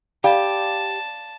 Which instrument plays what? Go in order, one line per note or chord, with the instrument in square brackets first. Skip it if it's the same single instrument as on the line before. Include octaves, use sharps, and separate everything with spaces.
[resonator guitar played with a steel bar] G4 [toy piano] D5 F5 B5 [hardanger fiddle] A5